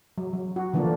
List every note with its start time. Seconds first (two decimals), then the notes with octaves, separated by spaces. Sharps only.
0.18 F#3
0.33 F#3
0.56 F#4
0.73 D3 E3 F3 A#3 D4